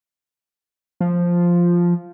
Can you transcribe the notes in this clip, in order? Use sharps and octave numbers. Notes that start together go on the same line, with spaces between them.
F3